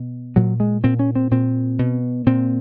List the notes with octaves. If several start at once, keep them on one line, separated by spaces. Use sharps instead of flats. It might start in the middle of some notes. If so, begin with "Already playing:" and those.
Already playing: B2
A#2 F#3
G#3
A#2 C4
C#4
C4
A#2 C4
B2
A#2 C4